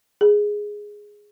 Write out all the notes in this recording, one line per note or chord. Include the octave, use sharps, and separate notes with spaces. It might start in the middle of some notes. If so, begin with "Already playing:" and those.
G#4